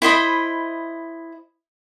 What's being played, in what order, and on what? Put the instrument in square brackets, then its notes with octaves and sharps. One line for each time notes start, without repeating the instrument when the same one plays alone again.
[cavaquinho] E4 C5 D#5 B5